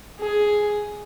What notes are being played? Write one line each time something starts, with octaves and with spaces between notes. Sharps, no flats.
G#4